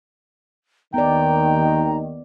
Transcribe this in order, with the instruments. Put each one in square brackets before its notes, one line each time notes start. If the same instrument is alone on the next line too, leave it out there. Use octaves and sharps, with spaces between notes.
[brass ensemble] D#2 D#3 [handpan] B3 D5 [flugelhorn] G5 [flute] A#5